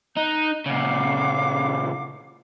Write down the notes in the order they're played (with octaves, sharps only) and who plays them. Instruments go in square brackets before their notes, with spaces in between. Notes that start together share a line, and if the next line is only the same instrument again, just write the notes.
[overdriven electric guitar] D#4 [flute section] F#6 G6
[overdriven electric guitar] A#2 C#3 [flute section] F5 F#5 D6